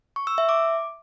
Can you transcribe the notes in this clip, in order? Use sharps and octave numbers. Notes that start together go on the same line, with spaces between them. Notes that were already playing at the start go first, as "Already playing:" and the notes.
C#6
E6
E5
D6